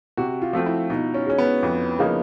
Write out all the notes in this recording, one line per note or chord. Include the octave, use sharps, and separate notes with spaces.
C3 F#4
F4
F3 A3 C4 F4
E4
B2 D#4
C#4
G#3 C#4
B3
F2
C#3 F3 A#3 D#4